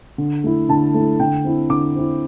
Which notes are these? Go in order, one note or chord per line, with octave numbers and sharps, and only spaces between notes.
D3
A3 E4
D3 A5
A3 E4
D3 G5
C4 E4
D3 D6
C4 E4